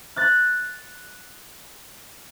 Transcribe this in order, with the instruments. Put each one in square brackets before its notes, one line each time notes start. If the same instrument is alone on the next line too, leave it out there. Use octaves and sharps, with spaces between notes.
[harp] F#6 A6